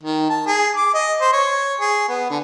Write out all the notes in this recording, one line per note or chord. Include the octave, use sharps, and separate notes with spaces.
D#3
A5
G#4
D6
D#5
C5
C#5
G#4
B3
D3